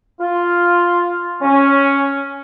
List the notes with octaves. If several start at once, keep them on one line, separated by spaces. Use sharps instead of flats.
F4
C#4